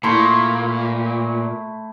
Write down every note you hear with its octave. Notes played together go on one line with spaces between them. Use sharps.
A#2 A3 E4 C6